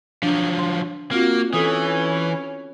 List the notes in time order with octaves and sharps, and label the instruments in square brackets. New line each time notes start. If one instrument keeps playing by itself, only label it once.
[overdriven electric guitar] F3 F#3 [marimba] D4
[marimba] D4 C6
[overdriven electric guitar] A#3 [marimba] C4 F4 [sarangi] F#4
[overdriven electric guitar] E3 [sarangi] C#4 [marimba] A4 D#6